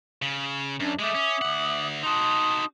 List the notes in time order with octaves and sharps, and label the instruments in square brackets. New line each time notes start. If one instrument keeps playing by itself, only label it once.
[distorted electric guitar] C#3
[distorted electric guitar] F#2 [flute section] C#4 D4
[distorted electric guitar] G#3 A3 [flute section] E5 D6 D#6
[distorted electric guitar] C#4
D2 F#5
[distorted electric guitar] D#4 F#4 [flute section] A5 C6 D#6